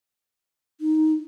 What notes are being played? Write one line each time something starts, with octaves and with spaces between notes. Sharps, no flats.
D#4